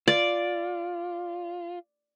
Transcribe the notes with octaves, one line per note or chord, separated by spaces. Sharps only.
F4 D5